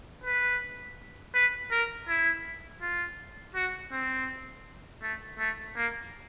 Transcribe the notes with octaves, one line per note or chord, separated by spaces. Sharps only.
B4
B4
A#4
E4
F4
F#4
C4
A3
A3
A#3